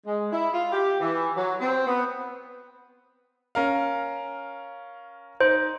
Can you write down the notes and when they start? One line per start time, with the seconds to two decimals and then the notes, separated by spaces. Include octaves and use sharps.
0.06 G#3
0.31 E4
0.52 F4
0.72 G4
1.00 E3
1.35 F#3
1.60 C4
1.87 B3
3.55 C#4 A#4 F5
5.40 D#4 C5